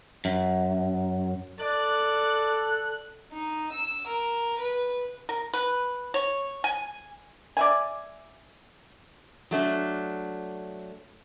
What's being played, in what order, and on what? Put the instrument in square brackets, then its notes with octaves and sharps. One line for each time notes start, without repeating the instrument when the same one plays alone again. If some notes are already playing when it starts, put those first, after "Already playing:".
[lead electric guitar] F#2
[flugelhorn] A4 [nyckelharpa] D5 [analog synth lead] F#6
[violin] D#4
E6
A#4
B4
[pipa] A#4
B4
C#5
G#5
D5 E5 G#5
[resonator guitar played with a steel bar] F#3 A3 D4